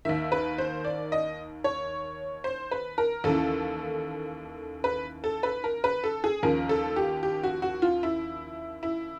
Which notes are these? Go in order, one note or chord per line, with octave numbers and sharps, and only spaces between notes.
D#2 D#3 E5
B4
C5
D5
D#5
C#5
C5
B4
A#4
D#2 C#3 E3 A4
B4
A4
B4
A#4
B4
A4
G#4
D#2 C#3 F3 A#4
A4
G4
G4
F#4
F#4
F4
E4
E4